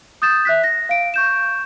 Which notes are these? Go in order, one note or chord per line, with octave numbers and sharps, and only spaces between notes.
D#6 G6 A6 E7
E5 F#6 B6
A#6
F5 D7
C#6 G6 E7